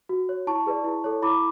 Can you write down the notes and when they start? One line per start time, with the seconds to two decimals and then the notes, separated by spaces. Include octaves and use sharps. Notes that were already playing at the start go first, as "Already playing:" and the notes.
0.09 F#4
0.29 C#5
0.47 E4 A5 C#6
0.66 G#4 B4 D5
0.84 E4
1.04 A4 C#5
1.22 E4 B5 D6